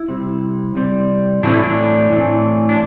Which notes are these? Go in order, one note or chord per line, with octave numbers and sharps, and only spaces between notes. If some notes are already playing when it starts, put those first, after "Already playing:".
Already playing: E4
C3 G3 C4
C3 G3 C4
A2 E3 A3 C4 D4
E4
D4
A2 E3 A3 C4
D4